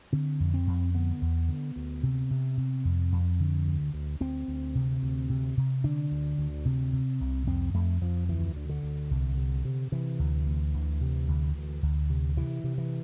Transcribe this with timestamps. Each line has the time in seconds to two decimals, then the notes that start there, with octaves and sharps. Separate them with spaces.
0.13 D3 C4
0.40 F2
0.54 C4
0.67 F2
0.94 D3 B3
1.21 E2
1.49 D3
1.76 D2
2.03 C3
2.30 C3
2.57 C3
2.85 F2
3.12 F2
3.40 D3
3.66 D2
3.94 D2
4.21 D2 C4
4.48 D2
4.75 C3
5.03 D2
5.30 C3
5.57 C3
5.84 D3 D4
6.11 D2
6.38 D2
6.65 C3
6.93 C3
7.20 C2
7.47 F2 C4
7.74 F2 A3
8.01 F2 F3
8.29 D2 E3
8.57 D3
8.69 D3
8.83 D2
9.11 C2
9.38 C3
9.65 C3
9.92 C3 E3
10.19 D2
10.47 D2
10.74 D2
11.01 C3
11.28 D2
11.55 D2
11.82 D2
12.10 C3
12.37 C3 E3
12.64 C3
12.78 E3